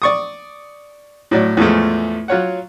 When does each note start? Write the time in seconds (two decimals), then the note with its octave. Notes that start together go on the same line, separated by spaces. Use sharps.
0.02 D5 C#6 D#6
1.31 A2 F#3 D5
1.57 E2 A2 F3 G#3 A3
2.28 F#3 F4 C#5 F#5